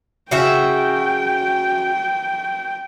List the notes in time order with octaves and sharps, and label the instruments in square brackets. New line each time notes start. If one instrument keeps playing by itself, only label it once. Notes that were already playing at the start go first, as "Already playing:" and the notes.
[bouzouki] C#3 F#4 E5 [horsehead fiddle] G5